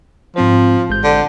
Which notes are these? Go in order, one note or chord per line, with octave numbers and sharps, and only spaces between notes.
G#2 F3 C4 C5
A1 G#3 G6
D3